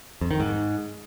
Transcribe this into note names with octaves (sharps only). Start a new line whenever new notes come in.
F2
D#3
G#2